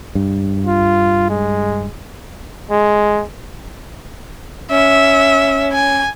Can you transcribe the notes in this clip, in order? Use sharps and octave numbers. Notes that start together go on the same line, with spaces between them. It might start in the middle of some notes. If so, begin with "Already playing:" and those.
G2
F4
G#3
G#3
C#4 E5
G#5